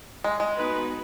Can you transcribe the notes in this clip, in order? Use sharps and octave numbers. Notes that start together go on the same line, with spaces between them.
G#3
G#3
B3 D#4 F#4 B4